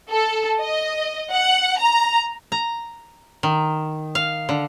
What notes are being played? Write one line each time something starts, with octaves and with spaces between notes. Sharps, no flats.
A4
D#5
F#5
A#5
A#5
D#3
F5
D3